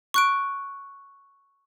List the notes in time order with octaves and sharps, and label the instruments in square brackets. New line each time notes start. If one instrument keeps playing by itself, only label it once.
[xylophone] C#6 F#6 D7